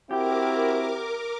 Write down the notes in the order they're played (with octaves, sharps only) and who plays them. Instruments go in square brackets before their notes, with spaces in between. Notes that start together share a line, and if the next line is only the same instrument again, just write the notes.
[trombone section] C4 E4 F#4 [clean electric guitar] G4 [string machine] A#4 D6